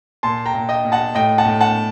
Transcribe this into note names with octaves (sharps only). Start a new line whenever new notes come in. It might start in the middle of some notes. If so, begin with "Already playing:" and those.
A#2 A5 C6
G5 A#5
A#2
D#5 G5
A#2
F#5 A5
A2 D#5 G5
F#5 A5
A2
F#5 A5